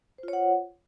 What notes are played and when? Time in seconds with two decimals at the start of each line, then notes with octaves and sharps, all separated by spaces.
0.18 C5
0.23 F4
0.28 C#5
0.33 F#5